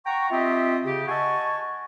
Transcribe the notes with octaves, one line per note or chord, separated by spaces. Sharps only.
F#5 G5 A#5 C#6
C4 F4 G4 D#5 E5
C#3 G4
D#5 F#5 G#5 A5 C#6